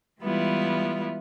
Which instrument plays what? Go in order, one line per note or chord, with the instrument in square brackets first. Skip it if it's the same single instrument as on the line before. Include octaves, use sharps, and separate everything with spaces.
[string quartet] E3 G3 G#3 B3 E4 F4